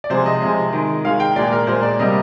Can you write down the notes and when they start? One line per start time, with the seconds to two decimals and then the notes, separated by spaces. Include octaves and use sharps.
0.04 D5
0.10 C3 F3 G#3 C5
0.26 D#5
0.42 C3 F3 G#3
0.73 D#3 G#3
1.05 D#3 G#3 F5
1.20 G5
1.36 A#2 G#3 D5
1.52 A#4
1.67 A#2 G#3 C5
1.83 D5
1.99 C3 G3 A#3 D#5